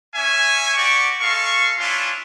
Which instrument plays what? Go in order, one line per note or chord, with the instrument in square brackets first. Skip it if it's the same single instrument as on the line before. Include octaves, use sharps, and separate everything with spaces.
[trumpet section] C#4 E5 G#5
F#4 G4 D5 C#6
G#3 A4 F5 C#6
C#4 D4 E4 F4